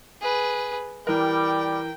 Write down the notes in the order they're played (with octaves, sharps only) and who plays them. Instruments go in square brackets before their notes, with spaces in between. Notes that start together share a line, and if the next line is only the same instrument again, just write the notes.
[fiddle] G#4 B4
[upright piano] E3 A#4 [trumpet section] G3 [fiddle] G5